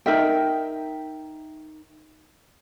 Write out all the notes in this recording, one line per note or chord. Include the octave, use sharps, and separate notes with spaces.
D#4 A#4 E5 G5